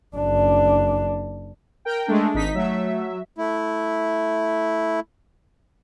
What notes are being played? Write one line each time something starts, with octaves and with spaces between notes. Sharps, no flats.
F#1 D4
A#4 G5
G#3 A3 D4
G#1 D#4 B6
F#3 A3 E5
A3 E4